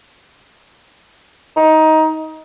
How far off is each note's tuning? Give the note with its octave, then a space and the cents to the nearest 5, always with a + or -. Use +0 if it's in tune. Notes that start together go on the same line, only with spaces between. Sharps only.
D#4 +15